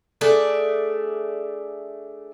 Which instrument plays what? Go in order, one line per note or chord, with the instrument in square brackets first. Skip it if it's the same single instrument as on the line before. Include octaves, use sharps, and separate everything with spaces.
[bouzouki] A3 D4 G#4